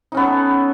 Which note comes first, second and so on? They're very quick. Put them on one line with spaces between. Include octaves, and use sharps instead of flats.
D#4 C#4 B3 A4